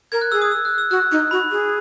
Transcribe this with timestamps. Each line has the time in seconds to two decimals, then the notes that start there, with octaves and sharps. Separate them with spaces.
0.12 A#4 G#6
0.21 F#6
0.32 G#4 E6
0.42 D#6
0.51 E6
0.65 F#6
0.78 E6
0.91 F#4 F#6
1.12 D#4
1.31 F#4 B5
1.51 G#4